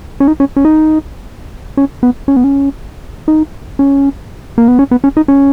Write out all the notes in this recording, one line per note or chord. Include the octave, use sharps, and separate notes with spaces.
C#4
D#4
C#4
C#4
D#4
C#4
B3
C#4
B3
C#4
D#4
C#4
A#3
B3
C#4
B3
C#4
D#4
C#4